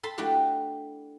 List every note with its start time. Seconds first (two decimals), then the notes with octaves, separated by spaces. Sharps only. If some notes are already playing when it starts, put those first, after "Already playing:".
0.03 A4 A5 B5 C6
0.18 A3 D4 E4 F#4 G4